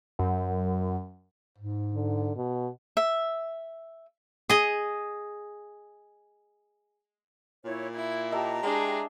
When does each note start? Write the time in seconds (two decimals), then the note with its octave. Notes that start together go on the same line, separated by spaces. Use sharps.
0.19 F#2
1.58 G#2
1.93 D3
2.36 B2
2.97 E5
4.50 G#4 D#5
7.65 A#2 E4 C#5
7.94 E4 G#6
8.31 G4 D#5 E5 A5 A#5
8.63 G#3 D4 G#4 G5